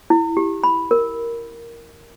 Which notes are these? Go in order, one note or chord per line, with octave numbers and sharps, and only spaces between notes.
E4
G4
B5
A#4